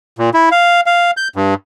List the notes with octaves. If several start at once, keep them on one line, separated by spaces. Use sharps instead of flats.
A#2
E4
F5
F5
G6
G2